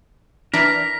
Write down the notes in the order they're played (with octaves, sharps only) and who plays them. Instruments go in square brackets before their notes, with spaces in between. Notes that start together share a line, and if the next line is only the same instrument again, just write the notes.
[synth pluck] E3 D4 [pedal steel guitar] A#4 [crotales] B6